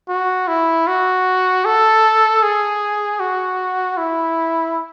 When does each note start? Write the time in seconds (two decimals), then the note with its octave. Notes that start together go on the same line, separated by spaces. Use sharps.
0.08 F#4
0.48 E4
0.87 F#4
1.65 A4
2.43 G#4
3.20 F#4
3.97 E4